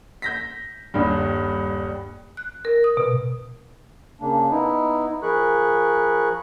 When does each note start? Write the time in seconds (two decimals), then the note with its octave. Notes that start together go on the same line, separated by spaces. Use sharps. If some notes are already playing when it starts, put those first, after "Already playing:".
0.22 G6 A#6 B6
0.94 D#1 G2
2.37 F#6
2.65 A#4
2.84 D#6
2.97 B2
4.21 C#3 A#3 D4
4.51 B3 D#4 E4
5.23 F3 G#4 A#4 B5 C#6 F#6